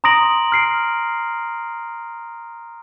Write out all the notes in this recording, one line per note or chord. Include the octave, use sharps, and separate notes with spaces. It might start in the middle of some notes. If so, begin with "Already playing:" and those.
A#5 C6 D#6 A#6 D7 F#7
F6 C7 D7